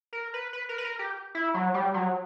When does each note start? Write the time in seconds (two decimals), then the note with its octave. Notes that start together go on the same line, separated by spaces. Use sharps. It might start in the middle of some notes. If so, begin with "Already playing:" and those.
0.13 A#4
0.34 B4
0.53 B4
0.69 A#4
0.78 B4
0.84 A#4
0.99 G4
1.35 E4
1.54 F#3
1.74 G3
1.94 F#3